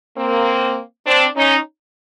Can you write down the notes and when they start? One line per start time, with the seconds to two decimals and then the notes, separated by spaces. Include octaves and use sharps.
0.17 A#3 C4
1.07 C4 D4
1.36 C#4 D#4